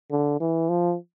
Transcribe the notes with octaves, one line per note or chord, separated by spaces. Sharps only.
D3
E3
F3